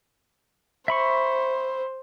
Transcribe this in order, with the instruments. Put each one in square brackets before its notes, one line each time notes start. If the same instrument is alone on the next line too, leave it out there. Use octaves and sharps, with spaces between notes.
[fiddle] C5 [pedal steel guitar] E5 B5 C#6